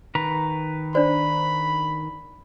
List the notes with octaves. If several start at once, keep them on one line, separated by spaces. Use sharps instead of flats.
D#3 B4 A#5
D4 C5 D5 B5